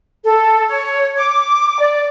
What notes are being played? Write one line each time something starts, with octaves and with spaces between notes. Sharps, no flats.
A4
C#5
D6
D5